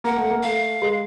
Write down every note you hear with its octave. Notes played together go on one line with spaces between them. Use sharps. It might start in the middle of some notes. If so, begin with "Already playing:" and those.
A#3 F#5
A3
A#3
A3 F5
G#3